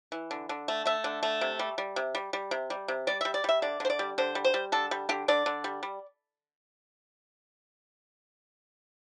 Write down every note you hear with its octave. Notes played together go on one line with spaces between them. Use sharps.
E3
D3
D3
A3
A3 E5
D3
A3
C3
G3
G3
C3
G3
G3
C3
G3
C3
G3 D5
G3 E5
D5
G3 E5
D3 D5
D3 C5
D5
G3
D3 C5
G3
C5
G3
D3 A4
G3
D3 G4
D3 D5
D3
G3
G3